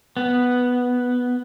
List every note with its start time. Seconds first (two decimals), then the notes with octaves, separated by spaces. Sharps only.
0.17 B3